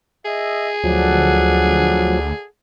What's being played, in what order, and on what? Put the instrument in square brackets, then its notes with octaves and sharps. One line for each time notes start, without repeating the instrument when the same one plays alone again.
[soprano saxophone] G#4 [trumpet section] D#5 E5
[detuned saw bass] D2 [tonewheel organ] F3 F#3 [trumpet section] A4 D5 F#5